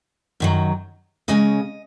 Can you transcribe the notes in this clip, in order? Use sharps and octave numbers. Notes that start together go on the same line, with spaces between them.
F#2 D#3 F#3
C#3 G#3 C#4 D#5